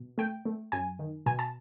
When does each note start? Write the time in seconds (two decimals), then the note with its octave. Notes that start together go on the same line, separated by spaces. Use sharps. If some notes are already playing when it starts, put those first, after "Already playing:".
Already playing: B2
0.18 A3 G5
0.45 A3
0.72 F#2 G#5
0.99 D#3
1.26 B2 G#5
1.39 A5